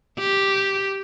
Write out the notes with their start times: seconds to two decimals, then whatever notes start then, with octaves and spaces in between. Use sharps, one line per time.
0.19 G4